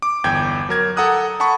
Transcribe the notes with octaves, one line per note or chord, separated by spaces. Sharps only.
D6
G1 E2 G5 G6 G#6
F#3 A#4 G#6
A4 F#5 A#5 D#6 F#6
F#5 A5 B5 C#6